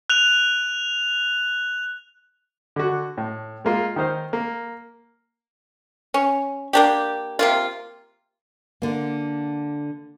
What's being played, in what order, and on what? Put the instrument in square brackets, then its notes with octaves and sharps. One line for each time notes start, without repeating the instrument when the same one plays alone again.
[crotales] F#6 F7
[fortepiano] D3 F#4
A2
G#3 A#3 F4
D#3 D#4 C5 F6
A#3
[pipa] C#4
A#3 D4 G4
C3 A#3 F4
[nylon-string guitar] D3 A#3